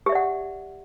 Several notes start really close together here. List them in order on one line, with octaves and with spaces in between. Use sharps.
G4 E5 D5 F#5